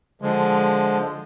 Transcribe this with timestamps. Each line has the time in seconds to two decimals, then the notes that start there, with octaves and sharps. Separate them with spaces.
0.22 D3 F3 G#3